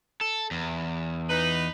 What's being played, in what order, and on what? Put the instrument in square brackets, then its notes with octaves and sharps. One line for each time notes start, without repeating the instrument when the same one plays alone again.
[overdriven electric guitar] A4
E2
[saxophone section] D#4 B4